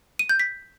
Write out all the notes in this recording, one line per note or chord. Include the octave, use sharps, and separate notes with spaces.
D#7
G6
B6